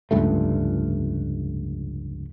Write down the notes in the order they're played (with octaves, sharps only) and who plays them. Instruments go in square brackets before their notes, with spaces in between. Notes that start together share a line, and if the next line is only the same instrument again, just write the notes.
[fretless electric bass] F1 C#2 G2 A3